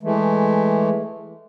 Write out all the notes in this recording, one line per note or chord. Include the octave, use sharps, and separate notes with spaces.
E3 G#3 A3